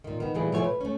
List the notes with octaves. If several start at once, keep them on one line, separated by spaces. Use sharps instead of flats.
A#2 D#3
D#3 B3
A#2 E3 G3 A3 G#4
B2 F3 A3 C#5 D5 G#5
B4
A3 C#4